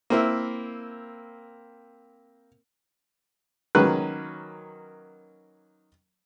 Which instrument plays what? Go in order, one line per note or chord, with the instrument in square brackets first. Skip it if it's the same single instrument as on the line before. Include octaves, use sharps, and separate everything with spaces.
[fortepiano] A#3 C4 E4
D#3 F#3 A#3 C#4 B4 F#6